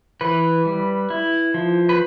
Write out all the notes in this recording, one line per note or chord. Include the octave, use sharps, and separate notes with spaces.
E3 B4
G3
E4
F3
B4